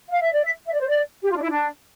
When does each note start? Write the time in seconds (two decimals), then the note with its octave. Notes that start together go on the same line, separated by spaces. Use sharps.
0.10 F5
0.20 E5
0.33 D5
0.43 E5
0.66 E5
0.73 D5
0.80 C5
0.88 D5
1.23 G4
1.31 F4
1.37 D4
1.41 E4
1.49 D4